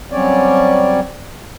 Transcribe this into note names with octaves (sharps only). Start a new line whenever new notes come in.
F#3 G3 C4 C#4 C#5 D5